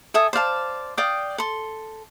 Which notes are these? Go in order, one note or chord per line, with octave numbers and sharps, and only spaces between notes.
A4 E5 G#5 D#6
C5 D5 F5 A5
D5 F5 G5 D#6
A4 C6